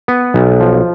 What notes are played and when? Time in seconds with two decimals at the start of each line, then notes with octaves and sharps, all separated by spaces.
0.08 B3
0.34 B1
0.60 F3